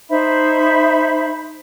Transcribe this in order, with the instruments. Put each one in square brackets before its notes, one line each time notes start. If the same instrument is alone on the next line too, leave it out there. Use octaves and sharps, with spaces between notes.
[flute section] D#4 C5 E5 B5